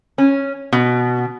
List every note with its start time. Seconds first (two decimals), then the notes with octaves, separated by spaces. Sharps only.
0.18 C#4
0.73 B2